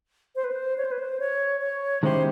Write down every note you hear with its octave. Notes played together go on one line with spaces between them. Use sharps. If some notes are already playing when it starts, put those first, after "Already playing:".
C5
B4
C5
C#5
C5
B4
C5
C#5
C#5
D#3 G#3 C#4 E4 G4 C5